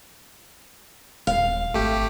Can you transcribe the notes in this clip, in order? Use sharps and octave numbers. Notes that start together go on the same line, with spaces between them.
D#1 F5
G#1 A3 G4